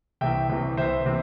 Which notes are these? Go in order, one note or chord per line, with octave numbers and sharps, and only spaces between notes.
C2 C3 E3 E5 G5
C2 C3 E3
C2 C3 E3 C5 E5
C3 E3